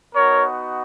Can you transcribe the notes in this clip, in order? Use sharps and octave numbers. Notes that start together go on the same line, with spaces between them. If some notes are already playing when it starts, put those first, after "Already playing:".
B3 D#4 F#4 A#4 C#5